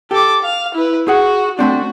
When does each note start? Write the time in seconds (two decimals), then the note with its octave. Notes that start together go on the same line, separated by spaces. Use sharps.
0.11 G4 A4 D6
0.43 F5
0.75 E4 B4
1.08 F#4 G#4 F#5
1.59 A3 C4 D4 F#4